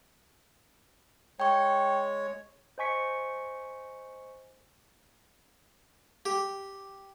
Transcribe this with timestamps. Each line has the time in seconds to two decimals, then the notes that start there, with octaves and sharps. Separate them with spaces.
1.40 G#3 C#5 G5 C#6
2.78 C5 D#5 G#5 C#6 B6 C#7
6.26 G4